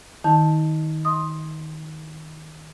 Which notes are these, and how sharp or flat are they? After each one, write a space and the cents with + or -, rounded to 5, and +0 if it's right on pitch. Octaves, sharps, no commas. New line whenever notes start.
D#3 +0 D#4 +40 A5 +0
D#5 +30 C6 +15 D#6 +0